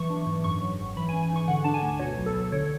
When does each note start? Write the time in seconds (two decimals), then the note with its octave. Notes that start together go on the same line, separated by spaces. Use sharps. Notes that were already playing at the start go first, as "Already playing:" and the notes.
Already playing: B1 E3 C#6
0.10 D4
0.26 G#2
0.44 F#2 C#6
0.61 F#3
0.79 G#1
0.97 E3 B5
1.09 G#5
1.13 C#4
1.23 G#5
1.31 G#2 C#6
1.48 D3 F#5
1.64 D4 A5
1.74 G#5
1.82 D2
1.99 B2 C#5
2.17 B1
2.26 A4
2.34 B1
2.52 D3 C#5